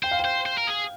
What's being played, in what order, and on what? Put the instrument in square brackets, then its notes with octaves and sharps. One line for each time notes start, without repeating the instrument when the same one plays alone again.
[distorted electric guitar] C5 [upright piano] G5
[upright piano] F5
G5
[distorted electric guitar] C5
C5
A#4
G#4